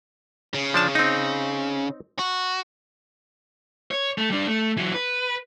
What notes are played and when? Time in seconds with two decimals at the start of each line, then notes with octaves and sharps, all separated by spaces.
0.54 C#3
0.74 F3 D4 A5
0.95 C4 D#4
2.19 F#4
3.91 C#5
4.18 A3
4.30 G3 D4
4.47 A3
4.77 E3 F#3
4.94 B4